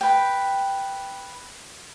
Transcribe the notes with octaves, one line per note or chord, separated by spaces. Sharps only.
B4 G5